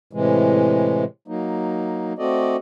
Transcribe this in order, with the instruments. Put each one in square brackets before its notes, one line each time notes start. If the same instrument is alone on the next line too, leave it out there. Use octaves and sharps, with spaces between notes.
[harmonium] A2 C3 E3 G#3
F#3 A#3 D#4
A3 C4 F#4 A4 D5 D#5